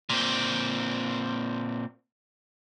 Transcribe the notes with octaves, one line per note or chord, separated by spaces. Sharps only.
A#2 C4